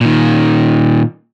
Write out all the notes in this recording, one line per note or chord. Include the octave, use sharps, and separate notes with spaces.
A#2 D#3